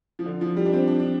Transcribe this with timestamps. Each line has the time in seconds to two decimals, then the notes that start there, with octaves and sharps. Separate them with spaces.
0.19 F3
0.26 D3
0.41 F3
0.57 G3
0.66 D4
0.73 C4
0.88 D4
1.00 D4